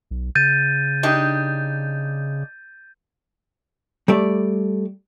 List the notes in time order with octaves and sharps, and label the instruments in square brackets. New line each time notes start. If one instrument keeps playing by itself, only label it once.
[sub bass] B1
[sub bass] C#3 [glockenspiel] G6 A6 D#7
[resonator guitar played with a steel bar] D4 D#4 G4
[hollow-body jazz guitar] G3 A3 D5